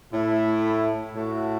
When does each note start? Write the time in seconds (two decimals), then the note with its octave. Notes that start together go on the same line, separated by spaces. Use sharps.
0.12 A2 A3 E4
1.14 A2 A3 F#4